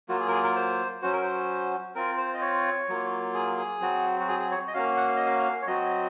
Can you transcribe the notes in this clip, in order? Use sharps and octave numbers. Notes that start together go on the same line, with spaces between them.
F#3 A#3 F4 F#4
G#4
A#4
G#4
A#4
C5
F#3 C#4 F#4 C5
A#4
C5
C4 F4 A#4
C5
D#5
C#5
F#3 A#3 F4
G#4
G#4
F#3 C4 F#4
F#4
G#4
G#4
C#5
D#5
A#3 C#4 F#4 F5
F#5
F5
D#5
F5
C#5
F#3 C4 F#4 D#5